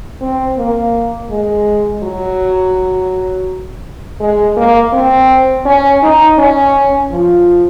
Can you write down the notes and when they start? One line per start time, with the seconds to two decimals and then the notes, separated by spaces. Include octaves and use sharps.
0.21 C4
0.57 A#3
1.31 G#3
2.03 F#3
4.20 G#3
4.57 A#3
4.93 C4
5.65 C#4
6.03 D#4
6.39 C#4
7.11 F3